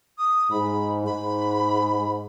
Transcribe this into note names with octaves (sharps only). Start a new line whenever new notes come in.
D#6
G#2 B5
G#2 B5